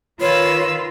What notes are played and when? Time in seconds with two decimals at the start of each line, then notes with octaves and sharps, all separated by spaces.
0.21 D#3 F4 B4 C#5 E6